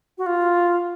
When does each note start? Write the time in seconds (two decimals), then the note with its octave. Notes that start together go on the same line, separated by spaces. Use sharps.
0.18 F#4
0.26 F4